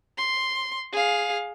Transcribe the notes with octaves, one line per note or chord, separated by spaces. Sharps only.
C6
G#4 F5